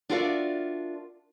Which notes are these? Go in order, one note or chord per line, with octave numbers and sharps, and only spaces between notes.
D4 F4 F#4 A#4 D5 E5